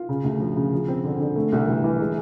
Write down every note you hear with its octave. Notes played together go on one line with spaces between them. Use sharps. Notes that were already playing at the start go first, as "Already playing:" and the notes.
Already playing: F4
C#3
D2
F3
C#3
F3
C4
D3
D3
A3
C2
E3
E3
G#3